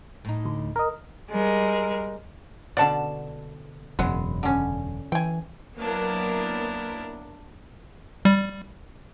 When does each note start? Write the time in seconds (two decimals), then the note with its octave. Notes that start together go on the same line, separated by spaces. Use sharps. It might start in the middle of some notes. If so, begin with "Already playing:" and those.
0.25 A2 D#4
0.45 D2
0.76 A#4 D#5
1.29 G3 G#3 A#4
2.77 B2 D3 D5 F#5 A5
3.99 E1 F#2 C#3 F#3 G#3 B3
4.43 D3 C#4
5.12 E3 G5 G#5
5.77 F#3 A#3 B3 D4 E4 A#4
8.25 G3